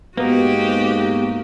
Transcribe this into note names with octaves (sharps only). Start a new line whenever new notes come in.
G#2 A#3 B3 D#4 F#4 G4